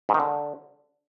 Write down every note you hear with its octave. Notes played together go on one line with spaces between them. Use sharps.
G#2
D#3
D3